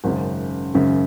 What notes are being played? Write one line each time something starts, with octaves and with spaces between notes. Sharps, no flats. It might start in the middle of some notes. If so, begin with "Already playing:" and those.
G#1 F#2 C#3
G#1 F#2 C#3